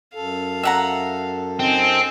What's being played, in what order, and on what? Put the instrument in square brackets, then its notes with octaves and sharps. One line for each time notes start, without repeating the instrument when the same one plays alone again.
[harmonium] F#2 A4 [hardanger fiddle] F5
[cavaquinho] E5 F#5 A#5
[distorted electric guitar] C4 [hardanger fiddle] D#4 G#5